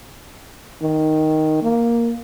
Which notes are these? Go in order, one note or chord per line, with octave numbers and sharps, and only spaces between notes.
D#3
A#3